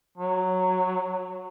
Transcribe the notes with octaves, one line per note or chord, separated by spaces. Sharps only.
F#3